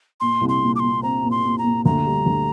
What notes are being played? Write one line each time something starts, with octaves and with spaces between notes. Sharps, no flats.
A#2 C6
C2
C6
A#2
D6
A#2 C6
C4 A#5
A#2
C6
A#2
A#5
A#2
D2 A#5
G3
D2